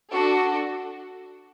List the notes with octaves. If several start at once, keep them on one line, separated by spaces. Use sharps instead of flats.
D4 F#4 A4